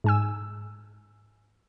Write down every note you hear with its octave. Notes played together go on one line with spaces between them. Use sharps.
G#2 G#5 E6